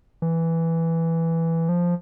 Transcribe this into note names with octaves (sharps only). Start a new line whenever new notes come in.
E3
F3